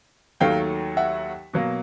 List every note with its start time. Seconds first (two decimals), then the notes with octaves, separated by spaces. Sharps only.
0.40 D#2 D#3 F#3 A3 F5 G5
0.97 E5 F#5
1.53 B2 F#3 A#3